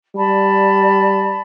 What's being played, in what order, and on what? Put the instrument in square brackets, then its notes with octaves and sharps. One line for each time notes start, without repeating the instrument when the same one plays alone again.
[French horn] G3 [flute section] D5 A5 B5